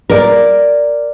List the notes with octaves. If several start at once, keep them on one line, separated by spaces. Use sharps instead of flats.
A#4 D5